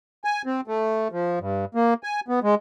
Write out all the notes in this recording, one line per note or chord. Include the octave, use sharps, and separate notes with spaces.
G#5
C4
A3
F3
G2
A#3
G#5
B3
G#3